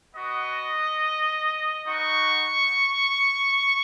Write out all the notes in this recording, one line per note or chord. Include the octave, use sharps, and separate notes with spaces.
B3 F#4 D#5
B3 D#4 F#4 C#6